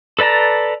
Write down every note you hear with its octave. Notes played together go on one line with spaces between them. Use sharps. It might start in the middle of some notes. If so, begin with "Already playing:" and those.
A4 B4 D5 A5 A#5